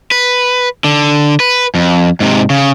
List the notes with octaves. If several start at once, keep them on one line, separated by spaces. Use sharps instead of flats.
B4
D3
B4
F2
G#2 C3
C#3